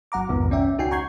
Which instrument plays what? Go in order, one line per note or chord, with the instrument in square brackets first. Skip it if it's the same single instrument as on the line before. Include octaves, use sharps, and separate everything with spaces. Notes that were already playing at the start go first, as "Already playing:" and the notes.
[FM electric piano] G1 F#3 F#5 A#5 D6
B1 F2 G#2 D#3 F3 B3
C#4 D5 E5 G5
C#2 D#4 F#4 G5 G#5 C7
F#5 A#5 C#6 G6 G#6 C7